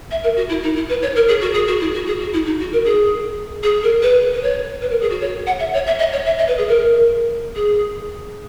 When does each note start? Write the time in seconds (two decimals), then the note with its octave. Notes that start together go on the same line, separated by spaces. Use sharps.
0.10 E5
0.23 A#4
0.36 F#4
0.49 E4
0.62 D#4
0.75 E4
0.88 B4
1.02 C#5
1.15 A#4
1.28 G#4
1.41 F#4
1.53 G#4
1.67 F#4
1.80 E4
1.94 F#4
2.07 G#4
2.20 F#4
2.33 E4
2.45 D#4
2.59 F#4
2.72 A#4
2.85 G#4
3.63 G#4
3.83 A#4
4.02 B4
4.33 B4
4.42 C#5
4.81 B4
4.90 A#4
5.01 G#4
5.10 F#4
5.20 C#5
5.46 F#5
5.59 E5
5.73 C#5
5.86 E5
5.98 D#5
6.12 C#5
6.25 E5
6.38 D#5
6.47 B4
6.57 G#4
6.68 A#4
7.55 G#4